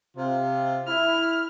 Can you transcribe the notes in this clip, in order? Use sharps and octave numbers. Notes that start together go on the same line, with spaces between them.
C3 F4
E4 F6